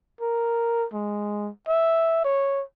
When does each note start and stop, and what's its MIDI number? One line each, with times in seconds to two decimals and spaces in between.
0.21 0.85 70
0.94 1.50 56
1.68 2.21 76
2.25 2.63 73